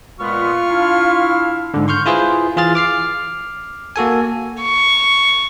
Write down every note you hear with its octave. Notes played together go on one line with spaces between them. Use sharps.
A#2 G#3 B3 F4 C#6 F6
D4 E4 F5
G#2 D3
C6 C#6 F6 G6
E4 F4 G#4 B4 C5
E3 F4 G#4 F6 A6
D6 F6 C7
A#3 F#4 A4 G#5
C#6